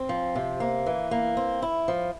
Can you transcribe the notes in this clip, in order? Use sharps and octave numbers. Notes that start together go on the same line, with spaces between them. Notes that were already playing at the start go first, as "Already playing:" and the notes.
Already playing: C4
F3
C3
A#3
E3
A#3
C4
E4
F3